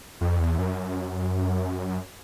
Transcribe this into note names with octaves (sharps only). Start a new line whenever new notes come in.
F2
E2
F#2